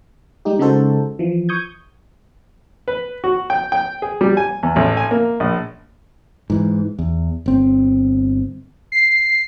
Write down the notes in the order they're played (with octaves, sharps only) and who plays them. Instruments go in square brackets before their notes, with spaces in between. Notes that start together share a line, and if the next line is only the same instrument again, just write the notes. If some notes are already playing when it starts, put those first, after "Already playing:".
[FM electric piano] G3 G#3 D#4 G4
C#3 G#3 D#4 F#4 A4 C5
E3 F3
C#6 D#6 G6 G#6
[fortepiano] B4
F#4
G5
G5
G#4
G3
G#5
E2
A1
G#5
A#3
A#1
[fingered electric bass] G#2 E3
E2
G1 C4
[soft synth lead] C7